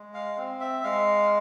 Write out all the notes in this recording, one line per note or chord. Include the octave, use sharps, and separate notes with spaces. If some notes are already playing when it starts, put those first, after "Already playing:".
Already playing: G#3
F5
C4
E5
G#3 F5